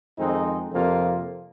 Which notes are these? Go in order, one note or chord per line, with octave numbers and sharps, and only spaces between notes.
F2 D#3 G#3 C4 D#4
F2 C3 F3 A#3 F4